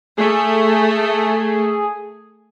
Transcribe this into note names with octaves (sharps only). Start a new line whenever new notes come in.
A3 G#4